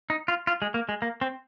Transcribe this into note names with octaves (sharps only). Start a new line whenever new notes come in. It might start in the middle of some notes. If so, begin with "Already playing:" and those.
D#4
F4
F4
G#3
A#3
G#3
A#3
C4